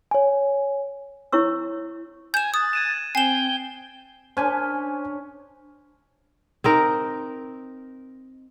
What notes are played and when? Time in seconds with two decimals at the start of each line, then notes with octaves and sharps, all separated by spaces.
0.11 C#5 G#5
1.33 E4 C#5 C#6 E6
2.34 G#5 G6 G#6 E7
2.54 D#6 F#6 A6
2.73 G#6 D#7 E7
3.15 C4 G5 G#5 C7 E7
4.37 C#4 D4 C5 G#5
6.64 C4 D#4 A#4